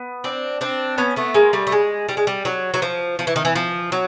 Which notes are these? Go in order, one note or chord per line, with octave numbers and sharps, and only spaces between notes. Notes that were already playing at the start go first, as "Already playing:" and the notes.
Already playing: B3
C4 D4
C4 D4
B3 C#4
A3 B3
G#3 A#3
G3 A3
A3
G#3
G3
G#3
G3
F#3
F#3
F3
F3
E3
D#3
E3
F3
F#3